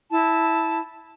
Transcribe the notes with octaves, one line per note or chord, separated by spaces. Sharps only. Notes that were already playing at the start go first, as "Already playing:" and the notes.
E4 A5